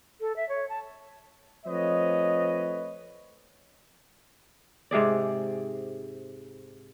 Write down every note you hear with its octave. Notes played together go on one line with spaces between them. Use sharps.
A4
E5
C#5
A5
F3 A3 C4 B4 C#5 D#5
G#2 C3 G#4 D5